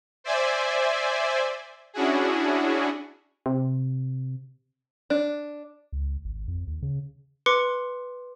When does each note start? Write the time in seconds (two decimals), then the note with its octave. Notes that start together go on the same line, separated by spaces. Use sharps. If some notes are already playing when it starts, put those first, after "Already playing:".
0.24 C5 D5 E5 G#5
1.93 C#4 D4 E4 F#4 G#4
3.46 C3
5.10 D4
5.93 C#2
6.25 G#1
6.48 F2
6.67 D#2
6.83 C#3
7.46 B4 C6 D6 C#7